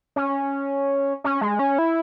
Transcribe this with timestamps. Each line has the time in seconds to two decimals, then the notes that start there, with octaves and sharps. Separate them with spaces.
0.16 C#4
1.24 C#4
1.41 G#3
1.59 C#4
1.78 E4